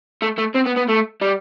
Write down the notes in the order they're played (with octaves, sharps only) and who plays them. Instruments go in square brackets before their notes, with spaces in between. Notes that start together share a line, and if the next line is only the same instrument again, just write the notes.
[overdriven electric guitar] A3
A3
C4
B3
B3
A3
G3